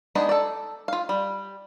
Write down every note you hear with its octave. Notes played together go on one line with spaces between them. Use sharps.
G#3 B3 D4 D#4 G#4
A4 D5
F4 F5
G3